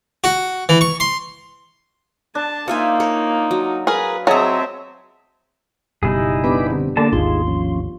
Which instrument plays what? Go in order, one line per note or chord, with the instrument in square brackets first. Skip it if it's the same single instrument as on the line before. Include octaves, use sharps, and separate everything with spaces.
[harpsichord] F#4
E3
C#6
C6
[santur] D4 [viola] A5
[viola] A#3 D#4 [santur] F4 [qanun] C5 E5 G#5
[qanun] A#4 C#5
F#3
[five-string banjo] G#4 A#4 [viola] B4
[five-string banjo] F#3 [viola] C4 E5 [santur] G#4 D#5 A5 [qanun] C#5 A#5
[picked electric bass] F#1 B2 [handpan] G3 [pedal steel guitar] D#4 E4 G#4
[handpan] B3 D4 G4 [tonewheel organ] B4 B5 D6
[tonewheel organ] D3 C4
[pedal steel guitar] D3 A#3 A5 [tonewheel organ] D4 A4 D5
[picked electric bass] G#1 D#2 [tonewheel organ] D#4 G#4 [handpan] F4 [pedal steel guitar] C6
[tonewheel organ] F3 C#4